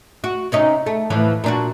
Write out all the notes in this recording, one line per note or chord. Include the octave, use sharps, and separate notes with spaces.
F#4
C3 C#4 D#4
A3
A2 E3 F3
A#2 D4 F#4